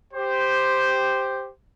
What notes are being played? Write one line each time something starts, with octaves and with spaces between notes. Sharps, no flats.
G4 C5